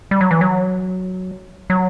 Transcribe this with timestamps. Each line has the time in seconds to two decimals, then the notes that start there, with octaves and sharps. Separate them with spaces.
0.11 G3
0.21 F#3
0.31 E3
0.41 F#3
1.70 F#3